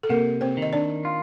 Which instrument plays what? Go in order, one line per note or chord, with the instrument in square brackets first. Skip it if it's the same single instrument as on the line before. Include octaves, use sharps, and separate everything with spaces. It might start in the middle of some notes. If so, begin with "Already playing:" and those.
[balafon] A4
[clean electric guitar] C3 [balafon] A#3 A#4
[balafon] C4 C5
[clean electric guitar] D#3
[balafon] D#5
D4 D5
[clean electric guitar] F4